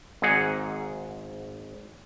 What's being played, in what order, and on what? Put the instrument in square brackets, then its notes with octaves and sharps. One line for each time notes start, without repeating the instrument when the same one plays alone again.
[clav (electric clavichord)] G#1 G#2 D#4 G#4 F#5